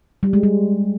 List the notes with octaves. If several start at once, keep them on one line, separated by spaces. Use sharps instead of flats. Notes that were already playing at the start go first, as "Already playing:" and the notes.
G3
G#3
G3